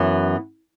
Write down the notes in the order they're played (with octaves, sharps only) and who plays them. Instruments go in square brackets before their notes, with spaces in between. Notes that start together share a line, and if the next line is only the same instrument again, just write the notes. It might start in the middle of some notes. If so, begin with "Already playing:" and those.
Already playing: [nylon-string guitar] F#2 E3 B3